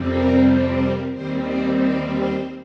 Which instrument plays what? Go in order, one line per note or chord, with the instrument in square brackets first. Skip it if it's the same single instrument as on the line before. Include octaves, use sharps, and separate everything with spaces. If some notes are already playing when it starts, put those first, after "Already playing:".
Already playing: [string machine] F2 C3 G3 C4
A#4
A#4
D#2 D#3 G3 C4 C5
C5
C5
C5